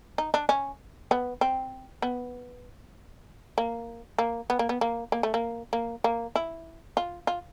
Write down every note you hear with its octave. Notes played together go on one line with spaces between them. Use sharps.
D#4
D4
C#4
B3
C4
B3
A#3
A#3
B3
A#3
B3
A#3
A#3
A3
A#3
A#3
A#3
E4
F4
F4